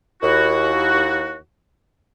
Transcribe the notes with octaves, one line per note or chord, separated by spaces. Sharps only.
D#2 E4 F#4